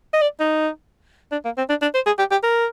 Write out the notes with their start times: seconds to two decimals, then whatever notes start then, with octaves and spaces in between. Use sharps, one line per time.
0.13 D#5
0.21 D5
0.40 D#4
1.32 D4
1.45 A#3
1.58 C4
1.69 D4
1.82 D4
1.94 C5
2.06 G#4
2.18 G4
2.31 G4
2.43 A#4